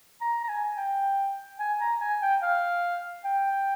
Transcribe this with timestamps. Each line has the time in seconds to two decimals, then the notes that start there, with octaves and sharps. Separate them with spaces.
0.21 A#5
0.44 A#5
0.49 G#5
0.77 G5
1.59 G#5
1.80 A#5
2.00 G#5
2.22 G5
2.42 F5
3.24 G5